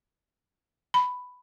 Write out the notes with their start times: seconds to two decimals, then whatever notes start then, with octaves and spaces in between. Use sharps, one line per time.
0.94 B5